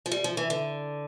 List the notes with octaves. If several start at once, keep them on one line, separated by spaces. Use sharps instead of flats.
F3
G3
F3
E3
D3